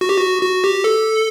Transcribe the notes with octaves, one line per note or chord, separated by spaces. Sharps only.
F#4
G4
F#4
F#4
G4
A4